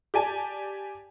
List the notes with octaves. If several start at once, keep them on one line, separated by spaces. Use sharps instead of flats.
G4 D5 G#5 A5